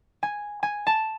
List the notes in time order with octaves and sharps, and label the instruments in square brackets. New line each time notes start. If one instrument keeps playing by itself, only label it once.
[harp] G#5
G#5
A5